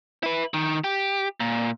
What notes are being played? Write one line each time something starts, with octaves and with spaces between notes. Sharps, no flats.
E4 B4
D#3
G4
A#2